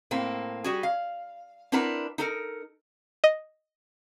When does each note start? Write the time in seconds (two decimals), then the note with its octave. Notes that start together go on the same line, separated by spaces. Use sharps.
0.11 A2 A#3 C4
0.64 G3 F#4 G#4
0.83 F5
1.72 C4 D4 E4 A#4 B4 F#5
2.18 D#4 A4 A#4
3.24 D#5